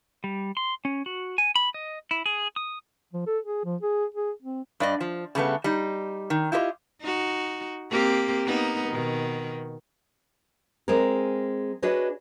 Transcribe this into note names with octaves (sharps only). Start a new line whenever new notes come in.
G3
C6
C#4
F#4
G#5
B5
D#5
E4
G#4
D#6
F3
A4
G#4
F3
G#4
G#4
C4
G2 D5 D#5
F3
C#3 G3 A3 B3
G3 D#4
D#3
E4 F4 G4 B4 D#5
D#4 F#4
A#3 C4 G4
A#3 B3 D#4
B2 D#3
G#3 C4 G#4 A#4
D4 F#4 G#4 B4 C#5 D#5